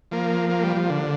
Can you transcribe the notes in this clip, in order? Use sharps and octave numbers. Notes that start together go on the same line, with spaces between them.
F3 A#3
A#3
G3
F3
D3